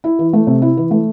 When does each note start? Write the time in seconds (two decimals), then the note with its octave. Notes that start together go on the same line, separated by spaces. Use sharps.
0.04 E4
0.19 E3
0.33 A3
0.47 C3
0.62 E4
0.77 E3
0.91 A3